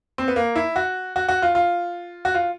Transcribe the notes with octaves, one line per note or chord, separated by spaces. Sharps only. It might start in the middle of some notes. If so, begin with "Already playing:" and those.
C4
B3
A#3
E4
F#4
F#4
F#4
F4
F4
F#4
F4